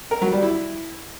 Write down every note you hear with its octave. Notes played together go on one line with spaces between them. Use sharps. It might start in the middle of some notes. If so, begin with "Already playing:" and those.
A#4
F#3
G3
E4